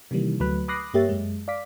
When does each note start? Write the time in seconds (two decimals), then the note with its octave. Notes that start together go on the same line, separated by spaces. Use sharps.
0.11 C3 D#3 E3 G3 A#3
0.40 D2 F#3 A3 B4 B5 F#6
0.68 B5 D6 D#6 F#6 A#6 C7
0.94 G2 A#3 G4 C#5 E5 A6
1.09 F#2 G#3
1.48 D5 F5 D6 B6